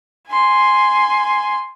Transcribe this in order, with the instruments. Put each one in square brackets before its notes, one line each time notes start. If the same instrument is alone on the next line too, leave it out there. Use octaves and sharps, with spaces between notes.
[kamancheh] G#5 C6